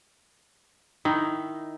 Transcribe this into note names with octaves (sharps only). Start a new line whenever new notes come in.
D#3 D#4 E4